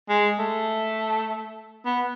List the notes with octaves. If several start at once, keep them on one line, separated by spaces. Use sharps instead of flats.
G#3
A3
B3